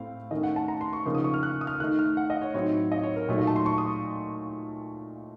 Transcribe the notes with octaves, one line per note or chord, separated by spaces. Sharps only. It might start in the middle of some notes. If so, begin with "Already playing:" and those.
Already playing: A2 A3 C4 F5
D#3 A3 C#4 D#5
F#5
A5
A#5
C6
C#6
C#3 F3 A#3 D#4
D#6
C#6
F6
F#6
D#6
F6
D#3 A3 D#4 F#6
F6
F#5
D#5
C#5
A2 F#3 C4 D#4 C#5
D#5
C#5
A#4
A#2 F#3 A3 D#4 C#5
D#5
A5
C6
C#6
D#6